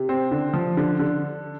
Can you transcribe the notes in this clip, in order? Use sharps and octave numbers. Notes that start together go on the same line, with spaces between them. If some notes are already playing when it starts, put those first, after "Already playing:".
Already playing: C3
C4
D3
F3
D3
D3